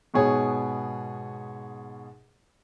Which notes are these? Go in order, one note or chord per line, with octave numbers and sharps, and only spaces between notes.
G#2 B2 B3 G#4 C#5